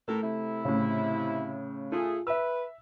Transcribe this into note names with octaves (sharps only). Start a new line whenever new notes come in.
A2 A3 A4 A#4
C3 E4
A2 C#3
A3 F4 G#4
B4 E5 E6